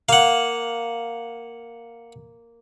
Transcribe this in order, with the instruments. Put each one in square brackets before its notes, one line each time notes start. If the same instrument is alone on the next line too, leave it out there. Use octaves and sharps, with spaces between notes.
[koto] A#3 [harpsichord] F5 F#5